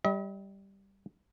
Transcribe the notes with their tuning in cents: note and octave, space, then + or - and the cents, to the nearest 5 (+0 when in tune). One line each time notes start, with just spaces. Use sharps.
G3 +0 D#5 +45